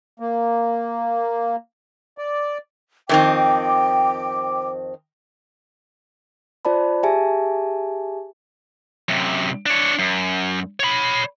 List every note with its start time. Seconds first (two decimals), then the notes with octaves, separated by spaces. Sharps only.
0.20 A#3
2.18 D5
3.09 F2 D#3 C4 G5 D6
6.65 F4 C5 D5 A5 B5
7.03 G4 G#4 E5 G#5 A5
9.09 F#2 C3
9.66 D4 C#5
9.99 F#2
10.80 C#5 B5